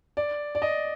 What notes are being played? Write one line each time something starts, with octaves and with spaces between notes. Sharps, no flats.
D5
D5
D#5